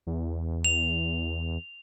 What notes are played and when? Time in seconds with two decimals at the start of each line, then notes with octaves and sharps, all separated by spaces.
0.07 E2
0.65 F7